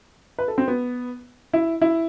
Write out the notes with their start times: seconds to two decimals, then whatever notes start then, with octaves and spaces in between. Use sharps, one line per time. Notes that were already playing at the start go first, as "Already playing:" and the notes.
0.39 B4
0.48 A4
0.58 C4
0.68 B3
1.53 E4
1.81 E4